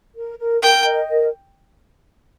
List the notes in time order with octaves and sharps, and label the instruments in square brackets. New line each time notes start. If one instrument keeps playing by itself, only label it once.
[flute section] A#4
A#4
[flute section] A#4 [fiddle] G5
[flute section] D#5
A#4